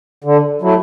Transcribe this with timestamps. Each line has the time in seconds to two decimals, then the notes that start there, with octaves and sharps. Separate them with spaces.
0.24 D3
0.62 F#3 A3 E4